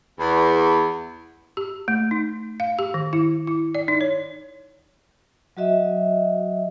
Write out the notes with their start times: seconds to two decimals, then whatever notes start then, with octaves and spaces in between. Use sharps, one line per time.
0.19 E2
1.57 G4
1.88 A3
2.11 D#4
2.60 F5
2.79 G4
2.94 D#3
3.13 E4
3.47 E4
3.75 D5
3.88 D#4
4.01 C#5
5.57 F#3 F#4 D#5 E5